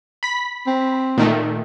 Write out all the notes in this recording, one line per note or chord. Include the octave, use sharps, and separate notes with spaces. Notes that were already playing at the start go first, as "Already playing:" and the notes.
B5 B6
C4
A#2 D#3 A3